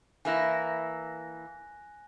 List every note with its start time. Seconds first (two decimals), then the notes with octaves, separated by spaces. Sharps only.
0.25 E3 A#3 E4 G#5 F#6 A#6